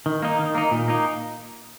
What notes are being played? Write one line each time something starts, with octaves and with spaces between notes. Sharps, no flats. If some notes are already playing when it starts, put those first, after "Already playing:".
D#3
A#3 D#4
D#3
A#3 D#4
A#2
A#3 D#4